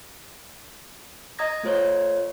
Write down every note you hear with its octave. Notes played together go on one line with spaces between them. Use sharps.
D#5 A#5 D#6 G#6 A#6
A3 F4 C5 C#5